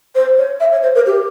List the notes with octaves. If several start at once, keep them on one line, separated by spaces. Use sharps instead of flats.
C5
C#5
E5
C#5
C5
A#4
G4